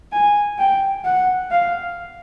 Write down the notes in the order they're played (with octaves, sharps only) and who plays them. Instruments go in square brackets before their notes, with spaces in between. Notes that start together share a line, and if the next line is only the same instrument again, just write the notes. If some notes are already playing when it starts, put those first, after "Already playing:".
[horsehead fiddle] G#5
G5
F#5
F5